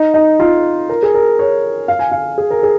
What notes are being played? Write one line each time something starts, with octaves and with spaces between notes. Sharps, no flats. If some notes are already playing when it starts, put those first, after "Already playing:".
Already playing: D#4
D#4
F4
A#4
G#4
A#4
C#5
F5
G#5
F5
G#4
A#4
G#4